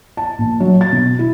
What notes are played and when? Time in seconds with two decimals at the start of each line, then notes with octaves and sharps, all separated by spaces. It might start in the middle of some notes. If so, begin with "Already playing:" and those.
0.17 A5
0.38 A#1
0.60 F#3
0.81 A6
0.93 B2
1.19 E4